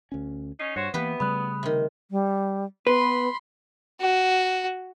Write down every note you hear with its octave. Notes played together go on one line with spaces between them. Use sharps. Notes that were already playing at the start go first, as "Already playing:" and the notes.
D2 C#4
C#4 D#4 C7
G2 F#4 C5 C#5
E3 A#3 B3 G4 B4 E5
C#3 G3 A3 B5 D#6 F#6
C3 D#3
G3
B3 B4 B5 C6
F#4